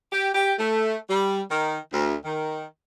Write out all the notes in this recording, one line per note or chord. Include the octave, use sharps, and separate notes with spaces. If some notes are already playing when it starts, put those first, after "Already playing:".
G4
G4
A3
G3
D#3
D2
D#3